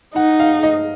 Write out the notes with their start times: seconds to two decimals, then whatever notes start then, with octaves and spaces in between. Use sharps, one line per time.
0.15 D#4 F#5
0.40 F5
0.63 D#5